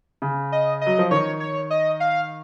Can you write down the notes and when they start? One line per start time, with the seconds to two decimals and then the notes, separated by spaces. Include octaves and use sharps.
0.22 C#3
0.52 D#5
0.81 D#5
0.86 F#3
0.99 F3
1.11 D#3 C#5
1.40 C#5
1.70 D#5
2.00 F5